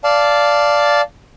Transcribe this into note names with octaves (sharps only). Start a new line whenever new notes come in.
D5 F5 A5